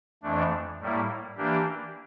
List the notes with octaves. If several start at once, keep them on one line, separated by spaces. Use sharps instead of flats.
F2 E3 A3 D4
A2 G3 A#3 E4
E3 A#3 D4 G4